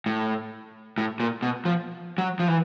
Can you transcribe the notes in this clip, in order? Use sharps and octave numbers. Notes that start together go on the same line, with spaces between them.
A2
A2
A#2
B2
F3
F#3
F3
E3